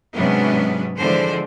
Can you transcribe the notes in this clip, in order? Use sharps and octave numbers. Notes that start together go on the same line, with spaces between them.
G#2 C3 F#3 B3 C#4 D4
D3 E3 F3 G#3 C5 D5